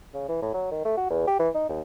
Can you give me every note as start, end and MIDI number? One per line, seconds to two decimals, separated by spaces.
0.14 0.27 49
0.28 0.38 52
0.42 0.50 45
0.54 0.70 54
0.71 0.82 51
0.85 0.93 57
0.97 1.06 66
1.10 1.26 40
1.27 1.37 67
1.39 1.49 52
1.54 1.68 63
1.69 1.81 39